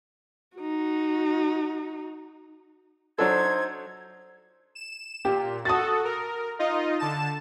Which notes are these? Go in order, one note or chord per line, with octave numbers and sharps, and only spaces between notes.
D#4 F#4
F#3 D4 D#4 A4 C5 G#6
E7
A#2 G4
F#4 A4 D#6 A6
A#4
D#4 F4 D#5
D3 A5 E7